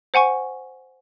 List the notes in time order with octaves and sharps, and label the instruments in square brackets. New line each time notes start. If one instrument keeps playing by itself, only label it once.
[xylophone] C5 F#5 G#5 C#6